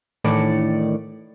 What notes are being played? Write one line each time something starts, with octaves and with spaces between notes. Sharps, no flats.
A2 D#3 E3 D4 D5 C#7